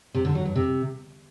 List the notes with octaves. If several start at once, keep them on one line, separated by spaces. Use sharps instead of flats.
C3
D3
F#3
G2
C3